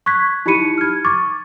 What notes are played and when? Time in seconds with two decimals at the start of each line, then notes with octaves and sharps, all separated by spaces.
0.06 C#6 F#6 G#6 B6
0.46 D#4 E4 G4 B5 C#7 D#7
0.78 F6 G#6
1.05 C#6 D6 A6